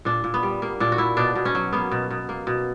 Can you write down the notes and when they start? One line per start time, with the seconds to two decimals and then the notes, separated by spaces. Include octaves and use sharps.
0.05 A#2 D4
0.24 A#2
0.34 B3
0.43 G3
0.62 A#3
0.80 A#2 D4
0.92 F#4
0.98 A#2 E4
1.17 B2 D4
1.36 B2
1.45 C#4
1.55 F#3
1.73 A#3 B3
1.92 B2
2.10 B2
2.29 A#3
2.47 B2